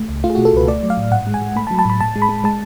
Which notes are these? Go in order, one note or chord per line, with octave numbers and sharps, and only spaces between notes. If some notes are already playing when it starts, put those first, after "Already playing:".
Already playing: A3
C#2
A3 F4
G#4
B2 F#4
A4
C#2 B4
A3 D5
F#3
F5
A2
G#2 F#5
G#3
G#5
G#3
A3 B5
A5
F#3
A5
A2 B5
A2 A5
G#3
B5
G#3
G#3 A5